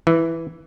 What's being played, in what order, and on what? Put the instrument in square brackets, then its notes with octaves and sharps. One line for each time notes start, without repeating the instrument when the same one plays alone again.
[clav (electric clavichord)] E3